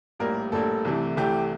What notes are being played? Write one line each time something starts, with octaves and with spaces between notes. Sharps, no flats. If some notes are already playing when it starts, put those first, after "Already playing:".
A#1 A2 G3 A#3 A#4
A#1 A2 G3 A#3 A4
C2 C3 E3 A3
C2 C3 E3 A3 G4